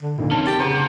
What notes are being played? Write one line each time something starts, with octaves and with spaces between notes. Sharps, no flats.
D3
F1 D2 A#2 D#3
C4 C#4 A5
G4 G5 A6
C#3 B3 C5 A#5
A#3